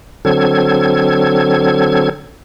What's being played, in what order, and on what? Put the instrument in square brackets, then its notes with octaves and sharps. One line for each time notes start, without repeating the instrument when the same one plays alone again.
[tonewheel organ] D3 F#3 C4 A4 G#6